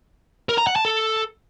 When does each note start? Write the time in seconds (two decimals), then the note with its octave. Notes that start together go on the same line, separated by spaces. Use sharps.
0.49 A#4
0.58 A#5
0.67 F#5
0.76 A5
0.85 A4